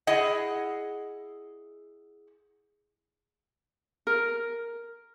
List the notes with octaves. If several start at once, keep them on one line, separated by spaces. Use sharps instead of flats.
E4 G#4 D#5 F#5
A#4